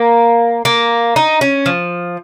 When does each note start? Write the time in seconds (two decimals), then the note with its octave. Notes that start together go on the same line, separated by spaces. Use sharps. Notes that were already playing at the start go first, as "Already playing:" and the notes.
Already playing: A#3
0.65 A#3
1.16 D#4
1.41 C#4
1.66 F3